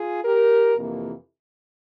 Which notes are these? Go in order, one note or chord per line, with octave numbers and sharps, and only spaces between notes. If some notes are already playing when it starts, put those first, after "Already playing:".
Already playing: F4 G#4
G4 A#4
F2 C3 E3 A#3